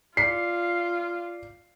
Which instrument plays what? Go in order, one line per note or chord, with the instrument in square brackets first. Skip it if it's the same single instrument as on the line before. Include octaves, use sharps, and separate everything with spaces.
[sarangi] F4 [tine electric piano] D5 C#7 [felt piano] C7